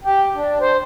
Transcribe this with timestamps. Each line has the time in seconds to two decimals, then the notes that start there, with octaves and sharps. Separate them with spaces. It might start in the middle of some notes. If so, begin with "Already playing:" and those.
0.04 G4
0.35 D4
0.61 C5